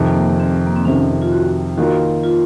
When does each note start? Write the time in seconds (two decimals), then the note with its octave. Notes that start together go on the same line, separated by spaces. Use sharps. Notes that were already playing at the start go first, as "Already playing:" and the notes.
Already playing: F2 C3 D#3
0.13 A#3
0.40 C4
0.67 A#3
0.76 C4
0.85 F2 C3 D#3 C#4
1.22 F4
1.32 F#4
1.77 D#3 A#3 F4 F#4 A#4
2.23 F4